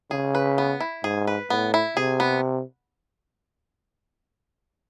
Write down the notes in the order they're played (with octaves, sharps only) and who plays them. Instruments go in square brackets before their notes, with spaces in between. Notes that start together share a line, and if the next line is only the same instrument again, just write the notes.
[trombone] C#3 [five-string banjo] G#4
[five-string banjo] B4
B3
E4
[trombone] G#2 [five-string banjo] G#4
[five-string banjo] B4
[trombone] A2 [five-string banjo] B3
[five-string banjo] E4
[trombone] C3 [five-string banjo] G#4
[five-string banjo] B3